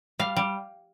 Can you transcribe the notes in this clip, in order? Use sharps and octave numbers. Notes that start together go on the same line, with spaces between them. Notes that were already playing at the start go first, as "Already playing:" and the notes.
G3 F5
G3